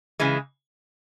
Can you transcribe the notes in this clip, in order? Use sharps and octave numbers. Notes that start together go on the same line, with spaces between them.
C#3 E3 G#3